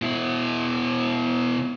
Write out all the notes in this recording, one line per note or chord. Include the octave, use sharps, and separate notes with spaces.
B2 E4